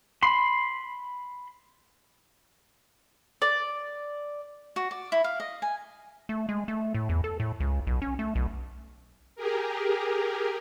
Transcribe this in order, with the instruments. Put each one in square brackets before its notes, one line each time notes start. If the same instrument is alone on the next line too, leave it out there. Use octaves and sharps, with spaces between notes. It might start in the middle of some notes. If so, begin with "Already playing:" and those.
[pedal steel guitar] B5 C6
[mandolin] D5
[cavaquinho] F#4
D5
E4
F5
D#5
G#5
[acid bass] A3
G#3
A3
A2
E2
A4
A2
C#2
B1
C#4
A3
B1
[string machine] G4 G#4 A#4